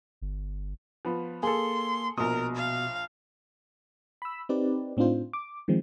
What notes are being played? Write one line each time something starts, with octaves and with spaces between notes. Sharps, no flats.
G1
F3 B3
A#3 G#4 A4 C6
A#1 B2 A#4 D#6
F5
B5 E6
C4 D#4 G4 B4 D5
A2 C4 D4 D#4 F4 C5
D6
D#3 F3 G#3 C4